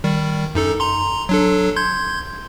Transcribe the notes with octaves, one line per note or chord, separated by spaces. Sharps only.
D#3 G3
F#2 D#4 A4
A#5 C6
F#3 D4 A4
C6 G6 G#6